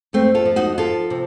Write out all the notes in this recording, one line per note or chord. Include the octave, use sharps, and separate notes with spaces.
F2 A3 C4
F4 A4
F3
D#4 F#4
F3 F4 A4
C3